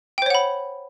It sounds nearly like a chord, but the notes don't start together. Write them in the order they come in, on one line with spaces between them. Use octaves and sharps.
G5 C5 C#5 F#5 B5